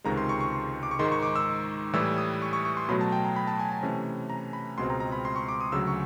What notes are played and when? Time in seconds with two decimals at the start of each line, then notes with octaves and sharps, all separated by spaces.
0.04 C#2 C3 D#3 G#3 A#5
0.17 C6
0.29 C#6
0.41 C#6
0.83 D6
0.91 C#6
0.99 G#2 D#3 G#3 C6
1.12 C#6
1.23 D6
1.36 E6
1.93 A2 E3 G3 E6
2.18 D#6
2.42 C#6
2.53 C#6
2.65 C#6
2.77 C6
2.89 B2 F#3 A3 B5
3.01 A5
3.12 G5
3.24 A#5
3.36 B5
3.47 A5
3.59 G#5
3.71 A5
3.83 C3 E3 A3 C#4
4.30 A#5
4.53 B5
4.78 C#2 B2 G#3 C4 C6
4.90 A#5
5.00 A#5
5.12 B5
5.25 C6
5.36 C#6
5.49 D6
5.61 D#6
5.72 D2 C#3 F#3 E6
5.87 C#6